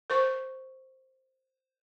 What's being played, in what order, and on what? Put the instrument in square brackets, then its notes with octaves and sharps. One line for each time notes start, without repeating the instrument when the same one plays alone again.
[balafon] A#4 C5 C#6